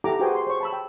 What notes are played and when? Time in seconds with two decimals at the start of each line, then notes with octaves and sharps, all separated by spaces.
0.04 E4 G4 A4 F#5 A#5 D6
0.19 F#4 G#4 B4 C5 G5 G#5
0.35 C6
0.47 C5 C#5 C#6
0.61 A5 B5 E6
0.73 G5